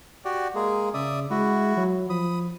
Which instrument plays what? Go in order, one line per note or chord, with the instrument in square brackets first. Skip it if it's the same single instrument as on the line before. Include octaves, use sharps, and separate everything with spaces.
[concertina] F#4 G4 D5
G#3 A#3 G#4
[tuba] C#3 [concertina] D5 E5 D#6
[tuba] G#3 [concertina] E4 F#4
[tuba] F#3
[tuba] F3 [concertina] B5 D#6